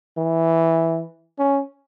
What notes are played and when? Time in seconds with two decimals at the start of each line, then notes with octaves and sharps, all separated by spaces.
0.17 E3
1.39 C#4